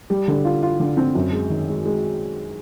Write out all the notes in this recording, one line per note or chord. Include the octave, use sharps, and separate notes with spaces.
G3
D3
F4
F4
D3
C4
F#2
G#3
D#3
G#3
G#3